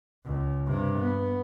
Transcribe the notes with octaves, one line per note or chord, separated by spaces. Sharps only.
C#2
G2 C3
B3